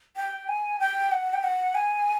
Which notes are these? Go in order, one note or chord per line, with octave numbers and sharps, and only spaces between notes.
G5
G#5
G5
F#5
G5
F#5
G#5